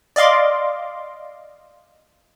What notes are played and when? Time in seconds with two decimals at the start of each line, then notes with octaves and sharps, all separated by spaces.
0.16 D5 D#5 F5 C6 D6